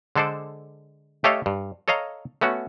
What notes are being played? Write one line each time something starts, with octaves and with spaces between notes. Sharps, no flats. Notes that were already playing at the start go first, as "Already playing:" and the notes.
D3 G#3 A4 C5 D5
A3 G4 A4 C#5 D#5 F5
G2
A4 C#5 D#5 F5 A#5
A3 B3 C#4 F#4